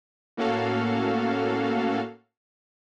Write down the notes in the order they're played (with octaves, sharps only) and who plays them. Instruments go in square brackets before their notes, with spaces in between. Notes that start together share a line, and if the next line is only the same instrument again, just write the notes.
[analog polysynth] A2 A#3 C#4 F#4 A4 F5